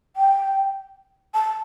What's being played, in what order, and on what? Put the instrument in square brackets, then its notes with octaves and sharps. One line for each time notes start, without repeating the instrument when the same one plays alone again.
[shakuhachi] G5
A5